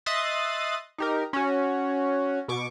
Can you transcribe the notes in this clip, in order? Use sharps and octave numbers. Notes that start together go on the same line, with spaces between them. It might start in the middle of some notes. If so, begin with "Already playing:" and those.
D#5 E5 C6 D#6 F#6 A6
D#4 G4 A#4
C#4 F#4
B2 C#6 D6